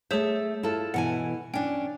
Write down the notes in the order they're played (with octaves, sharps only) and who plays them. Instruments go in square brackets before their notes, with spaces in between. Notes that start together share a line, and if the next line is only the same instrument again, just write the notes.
[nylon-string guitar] A3 E5 [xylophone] G#4 C#5 G6
[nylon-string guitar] E4 F4 A4
[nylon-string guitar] B2 E3 G#5 [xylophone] F#5
[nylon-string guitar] C#4 D4 [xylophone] G5